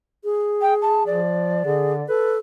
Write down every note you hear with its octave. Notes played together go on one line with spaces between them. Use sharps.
G#4
G5
A5
F3 D5
D3 G#4
A4 B4